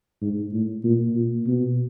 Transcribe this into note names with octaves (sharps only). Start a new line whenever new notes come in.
G#2
A2
A#2
A#2
B2